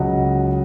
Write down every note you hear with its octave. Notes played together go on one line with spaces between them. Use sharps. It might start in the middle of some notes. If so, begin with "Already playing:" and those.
Already playing: C#2 C#3 F#3 D#5 F#5